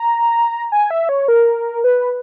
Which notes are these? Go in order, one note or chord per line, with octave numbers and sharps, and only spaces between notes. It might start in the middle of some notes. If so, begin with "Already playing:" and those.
Already playing: A#5
G#5
E5
C#5
A#4
B4